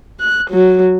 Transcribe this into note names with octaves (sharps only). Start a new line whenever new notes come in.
F#6
F#3